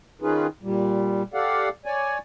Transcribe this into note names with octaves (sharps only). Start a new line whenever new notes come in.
D#3 C#4 D#4 F4 G#4 B4
A#2 G3
G4 A4 D5 F5 F#5
C#5 D5 G#5